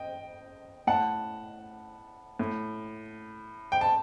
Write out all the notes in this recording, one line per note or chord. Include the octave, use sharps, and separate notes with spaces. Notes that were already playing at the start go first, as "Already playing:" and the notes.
Already playing: D#5 G5
A2 F#5 A5
A2
G5
A5